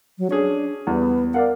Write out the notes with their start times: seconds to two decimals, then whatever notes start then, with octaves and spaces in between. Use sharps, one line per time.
0.18 F#3
0.31 C#4 D4 G#4
0.87 E2 G3 B3
1.34 A#4 D5 F5 F#5